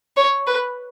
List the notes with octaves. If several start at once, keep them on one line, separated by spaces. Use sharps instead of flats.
C#5
B4